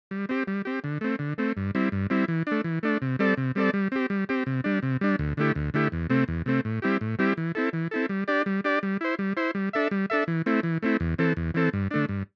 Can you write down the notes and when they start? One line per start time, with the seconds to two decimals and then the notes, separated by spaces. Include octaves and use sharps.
0.11 G3
0.29 C4 G4
0.47 G3
0.65 C4 G4
0.84 D3
1.01 A3 C4
1.19 D3
1.38 A3 C4
1.57 G2
1.75 G3 C4 E4
1.92 G2
2.10 G3 C4 E4
2.28 E3
2.47 A3 D4
2.64 E3
2.83 A3 D4
3.02 C3
3.19 G3 C4 A4 D5
3.37 C3
3.55 G3 C4 A4 D5
3.74 G3
3.92 C4 G4
4.10 G3
4.29 C4 G4
4.46 C3
4.64 G3 D4
4.83 C3
5.01 G3 D4
5.19 D2
5.37 D3 A3 E4 G4
5.55 D2
5.74 D3 A3 E4 G4
5.92 E2
6.10 C3 A3 C4
6.28 E2
6.46 C3 A3 C4
6.65 A2
6.82 G3 C4 E4 G4
7.01 A2
7.19 G3 C4 E4 G4
7.37 E3
7.55 C4 E4 A4
7.73 E3
7.91 C4 E4 A4
8.09 G3
8.28 D4 G4 D5
8.46 G3
8.64 D4 G4 D5
8.83 G3
9.01 E4 C5
9.19 G3
9.37 E4 C5
9.55 G3
9.73 D4 A4 E5
9.91 G3
10.10 D4 A4 E5
10.28 E3
10.46 A3 C4 E4
10.63 E3
10.82 A3 C4 E4
11.00 E2
11.19 E3 C4 A4
11.37 E2
11.54 E3 C4 A4
11.73 G2
11.91 D3 A3 D4
12.09 G2